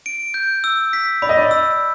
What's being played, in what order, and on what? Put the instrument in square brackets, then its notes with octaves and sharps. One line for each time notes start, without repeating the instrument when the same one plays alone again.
[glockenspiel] D7
G6
E6
B6
[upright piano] D5 [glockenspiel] B5
[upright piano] D#5
D5
[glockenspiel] E6